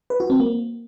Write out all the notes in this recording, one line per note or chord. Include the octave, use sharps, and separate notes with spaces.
B4
F#4
C4
A#3